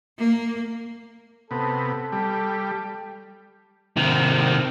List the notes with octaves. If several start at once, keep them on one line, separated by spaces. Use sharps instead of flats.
A#3
C3 B3 A4
G3
C3 D#3